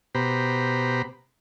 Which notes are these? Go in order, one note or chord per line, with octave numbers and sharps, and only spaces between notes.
B2 G4 C5 A#5 B5